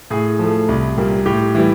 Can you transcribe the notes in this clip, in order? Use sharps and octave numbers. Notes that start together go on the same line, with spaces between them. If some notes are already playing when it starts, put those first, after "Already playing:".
A2 G#4
F3 A3
C2
A#2 G3 A#3
A2 G4
E3 G3